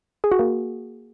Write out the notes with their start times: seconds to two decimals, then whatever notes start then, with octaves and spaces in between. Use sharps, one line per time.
0.24 G#4
0.31 F#4
0.39 A#3